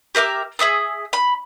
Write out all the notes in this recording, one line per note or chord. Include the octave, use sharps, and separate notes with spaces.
G4 A#4 E5 D6
G#4 E5 D#6 E6
B5